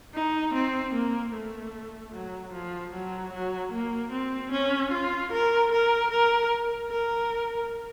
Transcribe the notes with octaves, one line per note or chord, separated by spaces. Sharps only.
D#4
C4
A#3
A3
F#3
F3
F#3
F#3
A#3
C4
C#4
F4
A#4
A#4
A#4
A#4